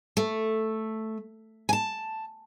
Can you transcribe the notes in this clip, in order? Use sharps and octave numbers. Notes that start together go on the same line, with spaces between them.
A3
G#5 A5